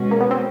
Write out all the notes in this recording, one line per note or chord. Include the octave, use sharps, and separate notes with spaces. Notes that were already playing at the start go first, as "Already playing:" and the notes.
Already playing: B2 G#3 C#4 F#4
A#3
B3
C4